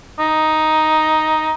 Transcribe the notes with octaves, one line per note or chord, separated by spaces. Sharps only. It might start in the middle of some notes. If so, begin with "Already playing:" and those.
D#4